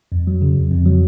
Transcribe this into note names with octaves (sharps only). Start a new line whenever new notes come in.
F2
F#3
C#3
F2
F2
F#3